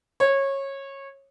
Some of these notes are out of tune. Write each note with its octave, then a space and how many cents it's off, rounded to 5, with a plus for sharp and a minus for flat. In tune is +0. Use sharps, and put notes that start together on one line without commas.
C#5 -20